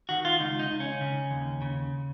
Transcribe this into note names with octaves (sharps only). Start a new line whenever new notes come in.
D#3 F#4
F4
C#2 D#4
D#4
C#2
C#4
C#3
D#2
C#3